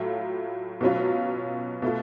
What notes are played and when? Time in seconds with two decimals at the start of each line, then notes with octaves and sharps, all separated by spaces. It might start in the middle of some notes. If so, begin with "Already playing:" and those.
Already playing: A2 F#3 A3 F4
0.81 B2 F#3 C#4 F4
1.82 B2 A3 F4